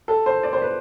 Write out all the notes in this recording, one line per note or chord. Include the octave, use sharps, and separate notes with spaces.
A4
C5
D5
C5
B4